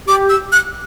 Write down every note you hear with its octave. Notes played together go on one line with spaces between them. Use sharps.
G4 D6
E6
F#6